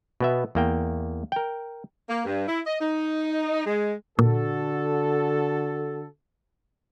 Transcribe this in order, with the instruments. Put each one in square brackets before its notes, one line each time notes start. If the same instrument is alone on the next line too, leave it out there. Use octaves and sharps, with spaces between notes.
[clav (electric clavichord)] B2 B3 E5
E2 A#3 G5
A#4 G5
[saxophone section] A#3
G2
E4
D#5
D#4
G#3
[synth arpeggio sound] A#2 [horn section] D3 F#4 A4